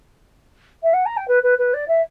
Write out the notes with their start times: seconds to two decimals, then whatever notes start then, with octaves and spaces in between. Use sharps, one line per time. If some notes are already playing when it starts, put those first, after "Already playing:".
0.83 E5
0.93 F#5
1.05 A#5
1.17 G5
1.27 B4
1.43 B4
1.58 B4
1.73 D5
1.88 E5